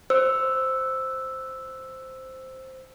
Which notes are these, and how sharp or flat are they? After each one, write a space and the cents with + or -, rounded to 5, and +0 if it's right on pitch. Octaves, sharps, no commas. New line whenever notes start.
C5 +0 E6 +0